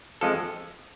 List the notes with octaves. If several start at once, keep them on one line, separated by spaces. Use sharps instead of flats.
F2 F3 G#3 A4